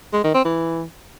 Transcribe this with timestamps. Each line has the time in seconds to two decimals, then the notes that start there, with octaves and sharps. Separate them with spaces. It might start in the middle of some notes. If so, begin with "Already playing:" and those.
0.13 G#3
0.24 D#3
0.34 C4
0.45 E3